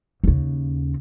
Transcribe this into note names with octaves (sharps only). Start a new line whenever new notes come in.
D#2 C#3